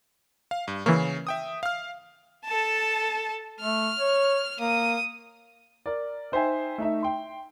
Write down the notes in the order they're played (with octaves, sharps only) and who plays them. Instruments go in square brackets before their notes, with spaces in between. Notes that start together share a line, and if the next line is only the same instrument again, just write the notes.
[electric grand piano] F5
G2
[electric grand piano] C#3 C#4 C#6 [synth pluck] E3 A#3
[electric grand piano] E5 G5 D#6
F5 F6
[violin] A4 A5
[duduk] A3 [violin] F6
[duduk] C#5
[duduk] A#3 [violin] D#6
[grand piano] A#4 D5
D#4 C5 E5 G5 G#5
A3 D#4 E5
G5 C6